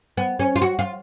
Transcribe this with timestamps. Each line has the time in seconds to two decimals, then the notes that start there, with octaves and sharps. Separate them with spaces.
0.17 B3
0.39 C#4
0.56 F4
0.62 F#4
0.79 F4